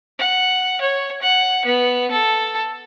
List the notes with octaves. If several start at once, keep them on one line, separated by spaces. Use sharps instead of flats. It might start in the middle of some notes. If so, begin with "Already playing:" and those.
F#5
C#5
F#5
B3
A4